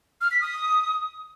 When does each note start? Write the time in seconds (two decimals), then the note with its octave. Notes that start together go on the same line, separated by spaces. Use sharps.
0.21 F6
0.31 B6
0.41 D#6